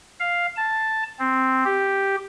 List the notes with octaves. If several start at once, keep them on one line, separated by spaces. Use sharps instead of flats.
F5
A5
C4
G4